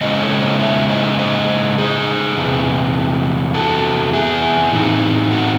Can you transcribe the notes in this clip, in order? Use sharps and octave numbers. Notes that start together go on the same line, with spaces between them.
C#3 G#3 C#4 E4 C5 D#5
A4 C#5
C5 D#5
C#5 E5
C5 D#5
C5 D#5
G#4 C5
E2 C3 E3
F#4 A4
E4 G#4
A2 E3 C4 D#4
F#4